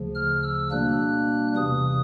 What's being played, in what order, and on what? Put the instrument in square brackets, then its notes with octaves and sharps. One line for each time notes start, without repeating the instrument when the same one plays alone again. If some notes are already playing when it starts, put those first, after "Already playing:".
Already playing: [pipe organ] D2 C#3 F3
F6
E6
B2 G3 A#3 D4 F#6
E2 C3 E3 G3 D#6